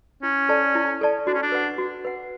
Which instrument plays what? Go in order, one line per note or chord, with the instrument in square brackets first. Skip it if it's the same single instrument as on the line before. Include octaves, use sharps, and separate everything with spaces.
[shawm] C#4 [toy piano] E4
[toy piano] A4 D5 A5
E4
A4 D5 A5
[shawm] D4 [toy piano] F#4
[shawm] C#4
D4
[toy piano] B4 F#5
F#4
B4 F#5